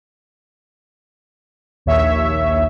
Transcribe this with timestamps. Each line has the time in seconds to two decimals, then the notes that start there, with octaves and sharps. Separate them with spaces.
1.86 A#1 D#2 C#5 E5